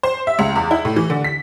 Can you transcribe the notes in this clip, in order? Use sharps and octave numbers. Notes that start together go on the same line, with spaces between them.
C5
E5
C#2
E2
E4
A2
E3
D3
B6